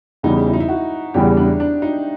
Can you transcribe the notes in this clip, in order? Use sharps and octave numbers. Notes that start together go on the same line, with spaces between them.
E2 C#3 E3 G3 D#4
E4
D#4
E4
F#4
E2 C#3 E3 G3 G4
D4
D4
D#4